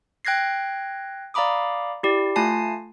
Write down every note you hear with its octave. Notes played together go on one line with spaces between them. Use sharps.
G5 F#6 G#6 A#6 C7
D5 F5 A#5 B5 D6 D#6
E4 G4 D5
A3 F4 G#5 A5 C7